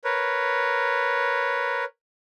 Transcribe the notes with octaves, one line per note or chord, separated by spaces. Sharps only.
A#4 B4 C#5